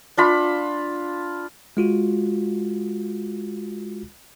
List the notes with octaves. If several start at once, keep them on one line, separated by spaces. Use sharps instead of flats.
D4 F4 B5
G#3 F4 F#4